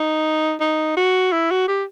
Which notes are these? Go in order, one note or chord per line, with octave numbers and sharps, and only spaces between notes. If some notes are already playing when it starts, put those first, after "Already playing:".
Already playing: D#4
D#4
F#4
E4
F#4
G4